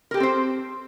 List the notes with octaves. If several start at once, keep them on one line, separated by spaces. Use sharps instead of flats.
C4 G4 A4 A#4 C5